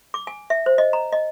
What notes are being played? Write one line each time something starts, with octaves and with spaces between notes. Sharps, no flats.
D6
G#5
E5
C5
D#5
A#5
D#5